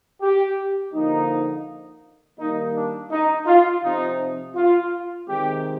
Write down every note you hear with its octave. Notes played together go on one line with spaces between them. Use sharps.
G4
D3 F3 A#3 D#4
D#3 G3 A#3 D#4
D4
D#4
F4
C3 F3 C4 D#4
F4
C3 D#3 G#3 C4 G4